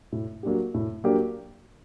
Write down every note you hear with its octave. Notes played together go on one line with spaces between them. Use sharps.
A2
F#3 A#3 D4 G4
A2
F#3 A#3 D4 G4